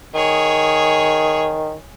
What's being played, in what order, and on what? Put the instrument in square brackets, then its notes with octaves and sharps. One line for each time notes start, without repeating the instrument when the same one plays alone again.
[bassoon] D#3 [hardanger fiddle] G#4 C#5